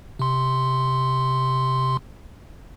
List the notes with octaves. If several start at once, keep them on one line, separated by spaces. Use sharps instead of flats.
C3 C6